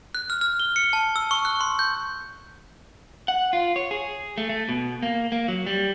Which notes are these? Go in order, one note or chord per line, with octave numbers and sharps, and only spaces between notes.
F#6
F6
F6
G7
C#7
A5
E6
C#6
F#6
C6
G6
F#5
F4
C#5
G#4
A3
A3
B2
A#3
A#3
F#3
G3